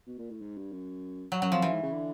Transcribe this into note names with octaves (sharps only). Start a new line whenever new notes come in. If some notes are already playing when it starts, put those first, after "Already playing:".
B2
A#2
A2
G#2
G2
F#2
F#3
F#2 F#3
F2 F3
F#2 E3
G#2
C#3
D3